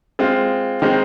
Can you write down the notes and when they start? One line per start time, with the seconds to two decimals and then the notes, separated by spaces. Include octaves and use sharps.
0.19 G#3 C4 F4
0.82 D#3 G#3 C4